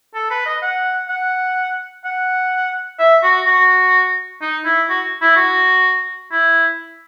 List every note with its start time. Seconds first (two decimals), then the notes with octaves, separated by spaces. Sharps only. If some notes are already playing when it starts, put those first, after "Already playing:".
0.15 A4
0.30 B4
0.46 D#5
0.62 F#5
1.09 F#5
2.05 F#5
2.99 E5
3.23 F#4
3.46 F#4
4.41 D#4
4.65 E4
4.89 F#4
5.21 E4
5.36 F#4
6.32 E4